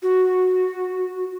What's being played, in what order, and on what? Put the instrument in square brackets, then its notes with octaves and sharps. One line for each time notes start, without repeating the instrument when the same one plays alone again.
[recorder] F#4